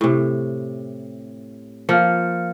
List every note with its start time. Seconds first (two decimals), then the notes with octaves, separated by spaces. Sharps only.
0.01 A2 C3
1.89 F3 A#3 F5 F6 C#7